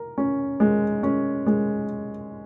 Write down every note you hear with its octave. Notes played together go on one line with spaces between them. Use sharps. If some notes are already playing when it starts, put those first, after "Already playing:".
Already playing: A#4
C#4
G#3
C#4
G#3